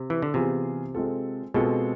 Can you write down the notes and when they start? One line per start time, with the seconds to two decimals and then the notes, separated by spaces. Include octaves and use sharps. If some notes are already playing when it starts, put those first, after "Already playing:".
Already playing: C3
0.10 E3
0.22 D3
0.34 C3 E3 B3 F4 G#4
0.95 G#3 C4 F4 A4
1.54 B2 G#3 C4 F4 A4